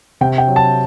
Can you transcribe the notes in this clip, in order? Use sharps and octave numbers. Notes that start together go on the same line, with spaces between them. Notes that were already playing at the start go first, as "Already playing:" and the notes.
C3 G5
G5
F#3
A5